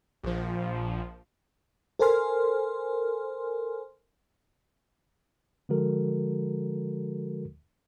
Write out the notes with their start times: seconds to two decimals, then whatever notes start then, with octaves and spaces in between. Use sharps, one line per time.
0.23 A#1 F3
1.99 A4 A#4 C5 G#5 C6 F6
5.69 D3 F3 G#3 F#4 A4 A#4